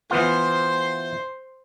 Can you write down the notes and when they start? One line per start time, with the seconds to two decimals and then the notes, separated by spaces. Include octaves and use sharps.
0.11 E3 B3 F4 C5 C6